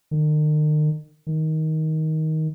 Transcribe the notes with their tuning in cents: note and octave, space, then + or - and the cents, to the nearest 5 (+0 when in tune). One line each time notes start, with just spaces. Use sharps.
D#3 -40
D#3 +15